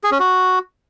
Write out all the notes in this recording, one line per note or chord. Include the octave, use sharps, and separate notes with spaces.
G#4
C#4
F#4